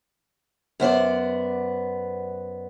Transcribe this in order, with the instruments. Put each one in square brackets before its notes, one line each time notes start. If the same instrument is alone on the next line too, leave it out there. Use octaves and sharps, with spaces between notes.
[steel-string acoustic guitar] F#2 B3 C5 D5